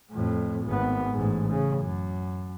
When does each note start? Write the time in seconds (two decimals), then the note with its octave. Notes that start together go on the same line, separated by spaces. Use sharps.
0.11 F2 A2
0.67 G#1 B3
1.11 A1 G#2
1.51 C#3
1.80 F#2